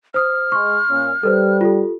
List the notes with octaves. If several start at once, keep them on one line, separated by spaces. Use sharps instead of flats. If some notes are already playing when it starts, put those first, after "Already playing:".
C5 D#6 F6
G#3 C6 C#6
A#2 C#4
G3 A4 B4 C5
F4 G4 A4